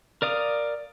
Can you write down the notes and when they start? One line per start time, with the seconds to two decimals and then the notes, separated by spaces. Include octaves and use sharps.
0.22 A#4 D5 F5 D#6